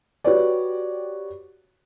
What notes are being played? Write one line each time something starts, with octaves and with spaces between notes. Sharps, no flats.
F#4 G4 B4 C#5 D5